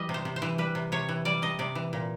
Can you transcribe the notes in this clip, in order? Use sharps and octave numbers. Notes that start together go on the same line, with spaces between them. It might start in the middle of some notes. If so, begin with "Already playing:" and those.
Already playing: E3 G3 D#5
C3
C5
C3
C5
E3
G3 B4
C3
C3 C#5
E3
G3 D5
C3 D#5
C3 D5
E3
A#2